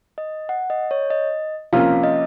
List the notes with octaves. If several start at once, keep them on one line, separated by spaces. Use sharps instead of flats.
D#5
F#5
D#5
C#5
D#5
C3 F3 A#3 C#4 F4 F5
D#5